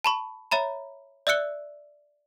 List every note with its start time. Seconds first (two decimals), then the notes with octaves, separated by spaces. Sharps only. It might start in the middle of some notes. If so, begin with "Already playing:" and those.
0.04 A5 B5 C#6
0.51 C#5 E5 A#5 B5
1.27 D5 E5 E6 F#6 C#7 G7